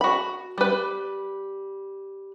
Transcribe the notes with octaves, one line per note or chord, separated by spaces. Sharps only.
F#4 B5
G3 B4